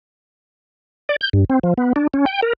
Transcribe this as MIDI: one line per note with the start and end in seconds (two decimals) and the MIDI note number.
1.09 1.16 74
1.21 1.29 91
1.33 1.45 43
1.50 1.59 60
1.63 1.74 53
1.78 1.93 59
1.96 2.07 62
2.14 2.25 61
2.26 2.41 79
2.43 2.53 70